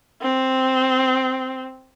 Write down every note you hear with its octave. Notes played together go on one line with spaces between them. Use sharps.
C4